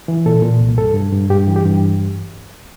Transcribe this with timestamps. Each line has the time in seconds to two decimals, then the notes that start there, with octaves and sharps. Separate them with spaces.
0.08 E3
0.26 A#2 A4
0.42 A#2
0.61 C2
0.78 G2 A4
0.94 G2
1.12 G2
1.30 G2 G4
1.48 E3
1.56 G4
1.65 G2